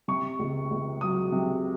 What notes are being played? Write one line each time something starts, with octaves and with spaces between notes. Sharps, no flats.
C3 C#6
C#2
C#2
F#3 D#6
C3